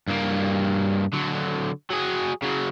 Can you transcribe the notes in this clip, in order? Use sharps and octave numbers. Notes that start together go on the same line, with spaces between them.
G2 A#3
D3 F#3
F#3 G#4
C#3 F#3